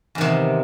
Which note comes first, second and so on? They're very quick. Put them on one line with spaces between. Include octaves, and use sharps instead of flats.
E2 D#3 C3